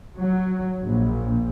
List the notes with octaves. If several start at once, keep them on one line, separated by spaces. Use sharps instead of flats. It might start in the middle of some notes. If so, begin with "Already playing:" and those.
F#3
A#1